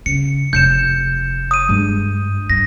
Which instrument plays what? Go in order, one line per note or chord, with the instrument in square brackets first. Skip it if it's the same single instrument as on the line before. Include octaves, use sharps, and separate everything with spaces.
[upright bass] C#3 [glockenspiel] C#7
[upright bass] F1 [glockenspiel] G6 C#7 E7
[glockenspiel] D#6 D#7
[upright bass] G2 G#3
[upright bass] G2 [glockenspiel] A#6